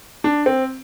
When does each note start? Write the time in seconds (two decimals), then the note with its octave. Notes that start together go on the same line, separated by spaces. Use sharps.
0.24 D4
0.46 C4